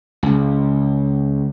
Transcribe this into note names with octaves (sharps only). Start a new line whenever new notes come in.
C#2